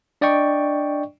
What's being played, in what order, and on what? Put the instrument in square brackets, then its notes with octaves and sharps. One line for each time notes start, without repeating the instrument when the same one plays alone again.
[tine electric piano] D4 D5 D#5 G5 C#6